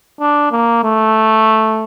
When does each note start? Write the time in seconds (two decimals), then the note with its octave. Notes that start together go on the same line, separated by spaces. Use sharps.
0.21 D4
0.52 A#3
0.84 A3